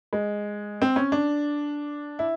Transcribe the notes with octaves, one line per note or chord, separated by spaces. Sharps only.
G#3
C4
C#4
D4
E4